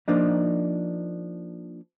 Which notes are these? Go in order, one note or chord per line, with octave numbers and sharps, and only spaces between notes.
F3 A#3 D4 D#4